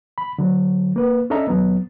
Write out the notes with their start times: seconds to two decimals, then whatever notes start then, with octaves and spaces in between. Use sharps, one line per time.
0.18 B5
0.38 D3 F#3
0.96 A#3 B4
1.30 C#4 D4 A4 D#5 E5 A#5
1.48 D#2 F#3 B3